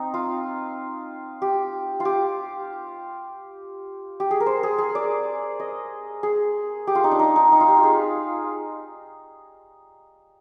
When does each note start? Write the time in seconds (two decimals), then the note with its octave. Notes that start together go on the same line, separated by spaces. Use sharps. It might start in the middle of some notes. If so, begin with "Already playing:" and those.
Already playing: C4 D#4
0.14 F4
1.42 G4
2.00 F4
2.05 G4
4.20 G4
4.31 G#4
4.40 A#4
4.46 C5
4.63 G#4
4.78 G#4
4.95 D5
5.60 D#5
6.23 G#4
6.87 G4
6.95 F4
7.04 D#4
7.12 D4
7.19 D#4
7.36 D#4
7.52 D#4
7.60 F4
7.68 G4
7.76 F4
7.83 G#4